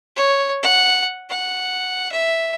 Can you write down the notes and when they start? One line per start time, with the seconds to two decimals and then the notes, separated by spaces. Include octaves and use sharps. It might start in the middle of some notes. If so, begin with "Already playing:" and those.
0.17 C#5
0.63 F#5
1.30 F#5
2.12 E5